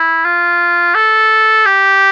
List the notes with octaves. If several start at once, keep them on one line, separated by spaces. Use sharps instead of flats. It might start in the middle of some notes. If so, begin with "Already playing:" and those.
Already playing: E4
F4
A4
G4